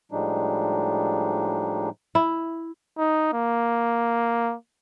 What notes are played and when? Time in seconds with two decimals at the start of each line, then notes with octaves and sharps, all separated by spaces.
0.12 A2 F3 G3 G#3 D4 D#4
2.15 E4
2.98 D#4
3.33 A#3